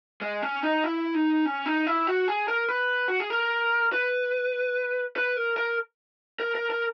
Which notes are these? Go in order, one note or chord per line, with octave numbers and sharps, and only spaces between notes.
G#3
C#4
D#4
E4
D#4
C#4
D#4
E4
F#4
G#4
A#4
B4
F#4
G#4
A#4
B4
B4
A#4
A#4
A#4
A#4
A#4